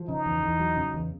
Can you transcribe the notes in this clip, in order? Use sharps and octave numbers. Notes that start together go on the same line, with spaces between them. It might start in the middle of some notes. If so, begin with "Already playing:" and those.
Already playing: F3
C#3 D#4
E2
E2
F#3
C#3
E2